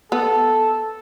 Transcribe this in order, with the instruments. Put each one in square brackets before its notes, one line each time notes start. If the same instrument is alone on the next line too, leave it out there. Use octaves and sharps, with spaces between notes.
[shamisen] B3 [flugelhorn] A4